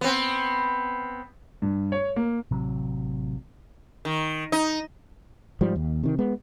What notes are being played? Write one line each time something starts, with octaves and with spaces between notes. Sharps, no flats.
B3 C4
G2
C#5
A#3
A1 C3 F#3
D#3
D#4
G#2 F3 G3
D#2
C3 D#3
G#3 B3